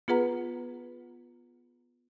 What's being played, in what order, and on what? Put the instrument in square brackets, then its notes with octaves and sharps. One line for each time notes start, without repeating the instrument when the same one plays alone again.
[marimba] B3 F4 G#4 B4 F#5 A#5